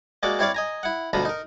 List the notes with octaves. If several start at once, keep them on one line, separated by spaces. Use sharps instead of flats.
G#3 A#3 F#4 D5
C4 E4 C#5 D5 F5
D#5 G#5 A#5
E4 F#5
D2 B2 D3 F4 A#5 B5
D#4 A#4